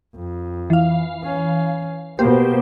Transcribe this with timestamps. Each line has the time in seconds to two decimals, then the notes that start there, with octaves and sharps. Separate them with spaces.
0.16 F2
0.70 E3 F5
1.24 C#4
2.19 B2 A#3 G4 C5